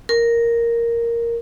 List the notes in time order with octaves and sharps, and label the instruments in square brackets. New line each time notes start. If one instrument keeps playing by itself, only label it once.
[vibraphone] A#4